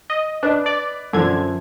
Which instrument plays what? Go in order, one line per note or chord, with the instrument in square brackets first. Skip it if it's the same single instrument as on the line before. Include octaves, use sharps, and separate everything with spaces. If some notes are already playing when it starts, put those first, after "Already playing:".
[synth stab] D#5
[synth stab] D4 [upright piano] B4 D#5
[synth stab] D5
[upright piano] F#2 F3 [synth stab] D3 G#6